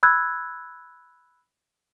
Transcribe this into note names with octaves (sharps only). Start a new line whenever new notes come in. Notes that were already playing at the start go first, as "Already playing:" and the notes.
B5 E6 F#6 G#6